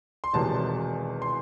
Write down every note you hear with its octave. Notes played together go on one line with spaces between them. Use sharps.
C6
E1 E2 C3 D#3 F#3 A5
C6